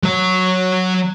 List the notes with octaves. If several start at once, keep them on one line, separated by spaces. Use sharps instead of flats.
F#3 C#5